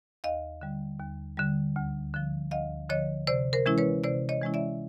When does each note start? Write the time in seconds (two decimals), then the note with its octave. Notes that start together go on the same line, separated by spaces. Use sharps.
0.24 D#2 D#5 F5
0.61 D3 G3
1.00 D#2
1.37 D3 G3
1.76 D2
2.14 D3 F3
2.51 D2 D#5 F5
2.90 D3 F3 C#5 D#5
3.27 C3 C5 D5
3.53 A#4 C5
3.66 E3 G#3 C#4 E4
3.78 B4 C#5
4.04 C3 C5 D5
4.29 C#5 D#5
4.42 E3 G#3 C#4 E4
4.54 D5 E5